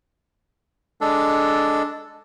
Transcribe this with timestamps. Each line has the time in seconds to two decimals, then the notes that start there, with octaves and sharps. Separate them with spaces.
1.01 G#3 D4 A4